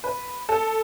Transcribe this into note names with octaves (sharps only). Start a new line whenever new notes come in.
B4
A4